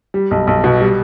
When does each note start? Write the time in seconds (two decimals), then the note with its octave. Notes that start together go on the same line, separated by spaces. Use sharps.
0.14 G3
0.31 B1
0.47 B1
0.64 B2
0.81 G3